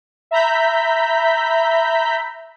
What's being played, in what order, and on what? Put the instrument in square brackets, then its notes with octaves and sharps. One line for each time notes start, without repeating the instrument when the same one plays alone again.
[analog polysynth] E5 A#5 B5 G6 B6